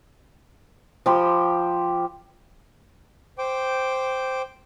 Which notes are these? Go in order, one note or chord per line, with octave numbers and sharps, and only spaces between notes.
F3 G4 B5
C5 G5 D6